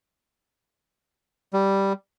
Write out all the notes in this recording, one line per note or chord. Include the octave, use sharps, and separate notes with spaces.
G3